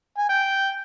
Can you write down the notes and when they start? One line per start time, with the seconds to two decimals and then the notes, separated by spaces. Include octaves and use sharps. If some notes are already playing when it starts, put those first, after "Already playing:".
0.18 G#5
0.29 G5